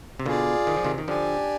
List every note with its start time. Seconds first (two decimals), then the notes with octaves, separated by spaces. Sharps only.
0.20 C3
0.26 B2 D3 F4 G#4 D5
0.67 D#3
0.76 F3
0.84 C3 D#3
0.98 D#3
1.08 D3 F3 D4 G4 D5 G#5